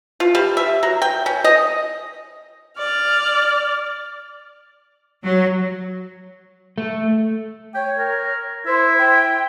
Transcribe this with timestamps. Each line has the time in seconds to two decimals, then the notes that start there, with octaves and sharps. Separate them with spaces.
0.20 F4
0.35 G3
0.57 E5
0.83 F#3
1.02 G5
1.26 C#4
1.44 D#5
2.78 D5 F6
5.24 F#3
6.78 A3
7.74 C#5 G5
7.97 A#4
8.66 E4 C5
8.98 G5